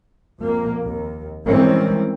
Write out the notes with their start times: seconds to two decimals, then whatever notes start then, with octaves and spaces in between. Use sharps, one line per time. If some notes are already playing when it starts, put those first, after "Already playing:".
0.41 F2 A#3
0.86 D#2
1.48 D#3 E3 G3 G#3 C4 C#4